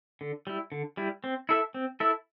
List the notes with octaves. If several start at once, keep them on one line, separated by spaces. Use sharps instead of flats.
D3
G3 E4
D3
G3 E4
C4
E4 A4 E5
C4
E4 A4 E5